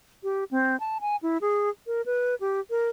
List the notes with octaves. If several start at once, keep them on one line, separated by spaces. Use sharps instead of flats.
G4
C4
A5
G#5
E4
G#4
A#4
B4
G4
A#4